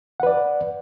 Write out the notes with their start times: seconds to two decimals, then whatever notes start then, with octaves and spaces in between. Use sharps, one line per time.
0.20 F#5
0.23 B4
0.27 D5